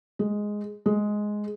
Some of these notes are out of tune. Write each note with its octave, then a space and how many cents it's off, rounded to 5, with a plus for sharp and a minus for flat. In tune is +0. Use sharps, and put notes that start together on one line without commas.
G#3 +0
G#3 +5